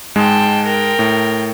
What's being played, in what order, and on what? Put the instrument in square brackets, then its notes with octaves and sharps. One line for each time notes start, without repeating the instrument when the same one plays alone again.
[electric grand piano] G#2 G#3 [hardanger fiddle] G5 A5
[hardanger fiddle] A#4 G5
[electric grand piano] A2